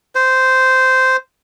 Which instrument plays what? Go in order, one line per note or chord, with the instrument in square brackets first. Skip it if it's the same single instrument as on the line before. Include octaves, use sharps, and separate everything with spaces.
[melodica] C5